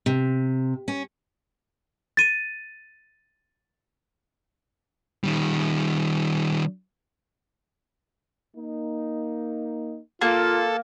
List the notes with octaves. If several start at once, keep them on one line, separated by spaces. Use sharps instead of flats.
C3
C#4
A6 D#7
D#3 G3
A#3 D#4
A#3 F4 A4